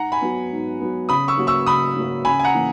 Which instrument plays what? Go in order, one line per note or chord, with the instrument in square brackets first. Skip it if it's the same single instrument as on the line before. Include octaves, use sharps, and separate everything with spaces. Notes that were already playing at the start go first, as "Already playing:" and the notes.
Already playing: [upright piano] G#2 [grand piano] F#5 A#5
[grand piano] G#5 B5
[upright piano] F#3 B3
G#2
F#3 B3
[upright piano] C#3 [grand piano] B5 D#6
[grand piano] C#6 E6
[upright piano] F#3 A#3 C#4 F#4
[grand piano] C#6 E6
[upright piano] C#3 [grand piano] B5 D#6
[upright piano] F#3 A#3 C#4 F#4
[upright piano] C#3 [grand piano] G#5 B5
[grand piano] G#5
F#5 A#5
[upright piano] E3 A#3